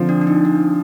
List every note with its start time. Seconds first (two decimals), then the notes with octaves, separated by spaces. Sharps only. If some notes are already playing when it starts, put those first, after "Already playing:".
Already playing: D3 F3 C4
0.09 D4
0.21 D4
0.27 D#4
0.45 D4